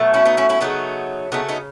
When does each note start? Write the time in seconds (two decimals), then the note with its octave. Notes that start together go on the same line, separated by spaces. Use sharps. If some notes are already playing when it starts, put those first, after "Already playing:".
Already playing: B2 F#3 A3
0.14 C#4 E4
0.25 B3 D#4
0.37 C#4 E4
0.49 C#4 E4
0.60 C#3 F#3 A3 B3 D#4
1.32 C#3 F#3 A3 B3 D#4
1.49 B3 D#4